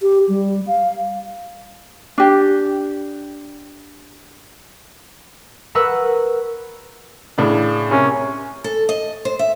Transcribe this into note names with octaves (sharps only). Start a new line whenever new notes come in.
G4
G3
F5
D4 G4
A#4 B4 F#5 C#6 E6
A2 C#3 D4
C3 C#4 A#4
A4
D#5
C5
E5